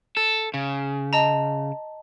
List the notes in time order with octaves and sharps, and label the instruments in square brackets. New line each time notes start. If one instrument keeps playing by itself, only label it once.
[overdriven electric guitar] A4
C#3
[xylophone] D#5 A5 A#5